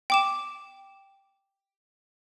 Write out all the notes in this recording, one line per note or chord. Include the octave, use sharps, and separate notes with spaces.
G5 D6 E7